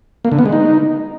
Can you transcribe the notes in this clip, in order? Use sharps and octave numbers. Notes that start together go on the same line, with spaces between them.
A#3
D3
B3
G#3
D#4